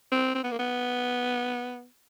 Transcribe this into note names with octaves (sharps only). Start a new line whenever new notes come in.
C4
C4
B3
A#3
B3